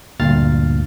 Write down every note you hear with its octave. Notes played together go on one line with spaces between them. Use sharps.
D2 G2 A#2 F5 F6 A6